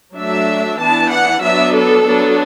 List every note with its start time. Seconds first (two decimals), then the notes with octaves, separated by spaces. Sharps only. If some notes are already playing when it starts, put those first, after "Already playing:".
0.15 F#3 A3 D4 E5
0.79 E3 B3 D4 A5
1.10 F#5
1.42 F#3 B3 D4 E5
1.74 A4
2.06 F#3 B3 D4